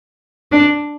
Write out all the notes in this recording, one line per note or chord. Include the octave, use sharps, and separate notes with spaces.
D4